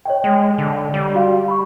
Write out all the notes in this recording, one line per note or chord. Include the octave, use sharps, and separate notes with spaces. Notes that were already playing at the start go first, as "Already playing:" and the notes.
C#5 D#5 G5
G#3
D3
G3
F#4 F5
B5 C#6